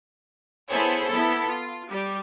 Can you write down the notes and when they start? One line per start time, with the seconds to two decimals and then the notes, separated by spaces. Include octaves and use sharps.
0.69 B3 E4 G#4 A4 C5 C#5
1.07 B3 E4 A4
1.47 F4
1.89 G3 G4